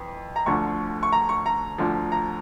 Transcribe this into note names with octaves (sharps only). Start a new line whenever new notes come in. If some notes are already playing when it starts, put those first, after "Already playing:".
Already playing: F2 E3
A#5
D2 D3 F3 C#6
C#6
A#5
C#6
A#5
D2 D3 F3
A#5